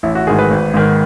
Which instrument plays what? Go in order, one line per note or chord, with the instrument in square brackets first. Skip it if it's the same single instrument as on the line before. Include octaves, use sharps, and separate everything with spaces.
[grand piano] A1 E4
F#4
G#2 D#3 G#4
B4
G#1
G#2 D#3